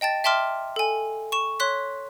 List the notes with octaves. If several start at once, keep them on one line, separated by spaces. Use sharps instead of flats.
D#5 G5 A5 A6
E5 G5 A5 C6 D6 F6
A4 G#5
C#6 E7
C#5 C6 F#6 B6